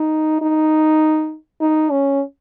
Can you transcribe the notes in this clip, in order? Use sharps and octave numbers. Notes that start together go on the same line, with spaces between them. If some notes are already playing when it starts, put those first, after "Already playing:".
Already playing: D#4
D#4
D#4
C#4